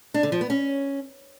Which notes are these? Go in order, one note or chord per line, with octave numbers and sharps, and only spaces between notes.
D4
D3
F3
B3
C#4